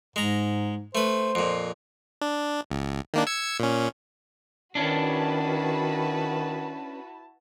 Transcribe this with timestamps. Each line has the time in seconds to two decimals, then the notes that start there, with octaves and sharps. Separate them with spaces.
0.16 G#2 G#3 A#5
0.95 A3 B4 C5
1.35 F2 A#2
2.21 D4
2.71 C#2
3.14 D#3 A#3 D4
3.27 E6 G#6 C#7
3.60 A#2 C#4
4.75 D#3 C#4 D4 E4 F#4 B4 A5